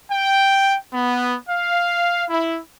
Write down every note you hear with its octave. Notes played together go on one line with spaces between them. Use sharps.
G5
B3
F5
E4